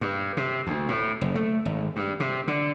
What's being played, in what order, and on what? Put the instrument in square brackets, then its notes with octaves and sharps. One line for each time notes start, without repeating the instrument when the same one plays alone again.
[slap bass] G2
C3
D2
A2
F#1
A3
G#1
G2
C3
D3